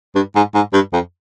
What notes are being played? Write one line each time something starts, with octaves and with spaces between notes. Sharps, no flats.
G2
G#2
G#2
G2
F2